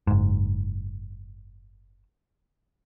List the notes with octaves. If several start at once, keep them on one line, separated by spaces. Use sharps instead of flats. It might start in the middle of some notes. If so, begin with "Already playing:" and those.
F#1 G#2